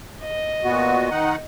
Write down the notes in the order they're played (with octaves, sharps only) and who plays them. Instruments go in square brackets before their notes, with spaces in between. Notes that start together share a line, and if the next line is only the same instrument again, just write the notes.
[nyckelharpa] D#5
[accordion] A#2 B3 F#4
D#3 D#4 F#5